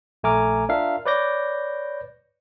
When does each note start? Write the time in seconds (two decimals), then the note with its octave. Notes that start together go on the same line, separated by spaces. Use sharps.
0.23 A#1 A3 G#5 A#5 D6 F6
0.69 D4 F4 A#4 E5 F5
1.06 B4 C#5 D5 D6 G6 A#6